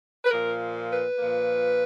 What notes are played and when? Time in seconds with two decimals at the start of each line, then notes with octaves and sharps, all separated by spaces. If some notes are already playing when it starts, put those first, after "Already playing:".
0.25 B4
0.31 A#2 F3 A#3 A#4
0.90 B4
1.19 A#2 F3 A#3